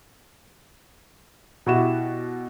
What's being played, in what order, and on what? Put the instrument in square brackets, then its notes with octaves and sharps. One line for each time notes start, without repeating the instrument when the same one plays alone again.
[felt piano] B2 E4 F#4 G4 E7